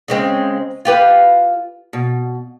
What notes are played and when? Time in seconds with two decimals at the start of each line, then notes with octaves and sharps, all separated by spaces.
0.08 C#3 G#3 C4
0.85 F4 G4 B4
1.93 B2